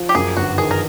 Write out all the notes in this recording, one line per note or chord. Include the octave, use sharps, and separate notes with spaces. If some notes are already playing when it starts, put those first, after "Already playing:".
Already playing: F3
G4
F#2 G#4
G1 F#4
D#3 G#4
A#4